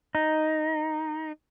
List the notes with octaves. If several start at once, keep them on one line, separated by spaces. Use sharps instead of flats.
D#4